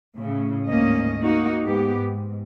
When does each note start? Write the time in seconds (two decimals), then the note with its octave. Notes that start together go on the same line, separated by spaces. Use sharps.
0.16 A2 C#3
0.66 D2 G#2 A#3 C#4 D#5
1.20 A#3 D#4 F#4
1.65 G#2 B3 G4
2.00 G#2